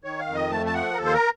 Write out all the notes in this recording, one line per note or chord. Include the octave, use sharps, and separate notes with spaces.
D#3 C#5
F5
F2
D#5
A3 A5
A5
F3 F#5
A#4
D#2 A4
C5
A#4